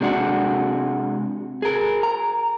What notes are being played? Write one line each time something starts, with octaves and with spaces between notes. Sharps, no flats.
C3 G#3 D4 F#4
G#4 A#4
A#5